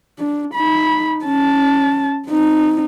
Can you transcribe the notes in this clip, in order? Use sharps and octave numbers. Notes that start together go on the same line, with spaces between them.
D4
D#4 B5
C#4 A5
C4 D#4